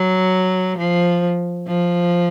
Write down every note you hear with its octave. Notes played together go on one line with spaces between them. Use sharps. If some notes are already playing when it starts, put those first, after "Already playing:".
Already playing: F#3
F3
F3